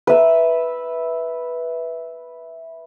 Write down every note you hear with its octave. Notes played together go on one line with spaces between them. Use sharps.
B4 E5